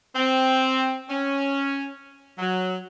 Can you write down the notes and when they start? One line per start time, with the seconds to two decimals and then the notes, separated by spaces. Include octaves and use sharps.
0.16 C4
1.08 C#4
2.38 F#3